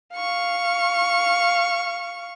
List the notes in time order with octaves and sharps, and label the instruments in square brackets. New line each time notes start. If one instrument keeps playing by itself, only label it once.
[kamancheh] F5 C#6